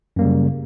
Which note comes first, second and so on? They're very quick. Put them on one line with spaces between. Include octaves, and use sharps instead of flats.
F#2 A#3 G3 C#3